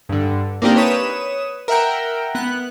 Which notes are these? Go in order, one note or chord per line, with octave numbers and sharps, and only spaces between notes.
G2 D3
A#3 C4 D4 D#4 G4 A#4
B4 C#5 D#6 E7
A#4 E5 F#5 G5
B3 F#6